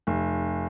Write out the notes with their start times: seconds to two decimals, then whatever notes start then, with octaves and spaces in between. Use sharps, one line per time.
0.07 F1